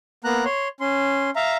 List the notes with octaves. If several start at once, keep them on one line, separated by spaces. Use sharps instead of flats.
A#3 B3 A#5 F#6
C#5 C6
C#4 C6
E5 F5 A#5